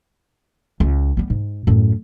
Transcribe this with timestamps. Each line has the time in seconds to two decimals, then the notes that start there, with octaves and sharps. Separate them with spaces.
0.80 C#2
1.17 G3 B3
1.30 G#2
1.67 F#2 A2